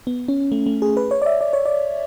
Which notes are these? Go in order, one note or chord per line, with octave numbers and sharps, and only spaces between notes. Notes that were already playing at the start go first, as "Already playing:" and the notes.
B3
C#4
A3
A3
G#4
B4
C#5
D5
E5
D5
C#5
D5